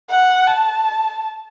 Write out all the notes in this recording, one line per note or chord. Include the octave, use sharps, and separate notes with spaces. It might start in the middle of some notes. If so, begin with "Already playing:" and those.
F#5
A5